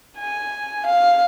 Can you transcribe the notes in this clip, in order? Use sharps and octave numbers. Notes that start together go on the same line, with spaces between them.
G#5
F5